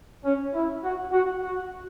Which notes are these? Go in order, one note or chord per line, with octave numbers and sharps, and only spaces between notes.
C#4
E4
F#4
F#4
F#4